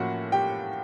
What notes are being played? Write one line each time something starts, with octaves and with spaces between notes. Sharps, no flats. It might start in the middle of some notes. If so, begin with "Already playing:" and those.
Already playing: A2 F3 A#3 C#4 E4 F#4 F#5
G4 G5